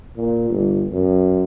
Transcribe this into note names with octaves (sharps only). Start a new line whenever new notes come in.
A#2
G1
F#2